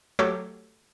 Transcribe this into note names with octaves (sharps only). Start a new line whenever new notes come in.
F#3 A3 G4 A4 C#5